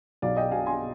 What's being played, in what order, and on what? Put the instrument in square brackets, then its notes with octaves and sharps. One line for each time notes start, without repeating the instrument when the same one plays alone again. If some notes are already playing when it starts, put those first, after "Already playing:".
[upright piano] B1 D5 F5
D#5 G5
B2 F5 G#5
G#5 C6